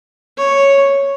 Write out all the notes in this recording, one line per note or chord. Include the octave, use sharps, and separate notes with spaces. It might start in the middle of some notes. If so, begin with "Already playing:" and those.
C#5